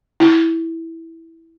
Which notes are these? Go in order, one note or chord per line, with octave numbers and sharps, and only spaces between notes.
E4